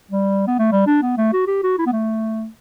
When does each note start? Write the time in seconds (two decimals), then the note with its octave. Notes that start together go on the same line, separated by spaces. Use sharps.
0.11 G3
0.47 B3
0.59 A3
0.72 G3
0.86 D4
1.02 B3
1.17 A3
1.33 F#4
1.47 G4
1.63 F#4
1.78 E4
1.86 B3
1.92 A3